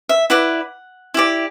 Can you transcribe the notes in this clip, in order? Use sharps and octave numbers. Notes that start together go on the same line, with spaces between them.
E5
E4 B4 D5 F#5
E4 G4 D5